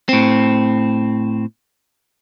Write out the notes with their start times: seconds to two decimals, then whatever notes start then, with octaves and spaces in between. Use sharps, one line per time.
0.09 A2 C4